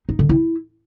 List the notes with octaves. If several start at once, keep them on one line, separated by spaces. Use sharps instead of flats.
D#4
D3
E4